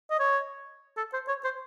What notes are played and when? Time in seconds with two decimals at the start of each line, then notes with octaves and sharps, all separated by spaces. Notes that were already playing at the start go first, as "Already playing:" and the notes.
0.10 D#5
0.20 C#5
0.97 A4
1.14 C5
1.28 C#5
1.44 C5